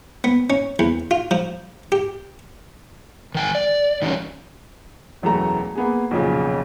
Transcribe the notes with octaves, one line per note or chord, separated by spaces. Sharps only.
B3
C#4
E2
F4
F3
G4
D#3 G5 G#5
D5
D#3 E3 F#3 G3 C#4
E1 F#2 E3 A3 A4 A#5
A#3 B3 G#4
B1 F2 A#2 C#3